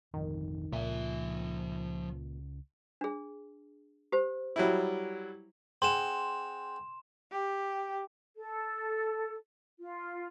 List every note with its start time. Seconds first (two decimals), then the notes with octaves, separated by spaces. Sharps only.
0.14 F1 A#1 F2 D#3
0.73 C#2 A#2 F3 E5
3.01 D4 G#4
4.12 G4 C5
4.56 F#3 G3 E4
5.82 C4 G#4 F#5 C6 E7
7.32 G4
8.37 A4
9.81 F4